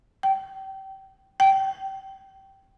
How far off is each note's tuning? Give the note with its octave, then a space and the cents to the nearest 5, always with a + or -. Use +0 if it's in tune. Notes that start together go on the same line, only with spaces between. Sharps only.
G5 -25
G5 -20